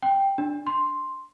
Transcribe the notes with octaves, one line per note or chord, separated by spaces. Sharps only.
G5
D4
C6